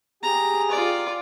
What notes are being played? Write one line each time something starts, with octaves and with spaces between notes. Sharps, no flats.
G4 G#4 A#5
F4 D5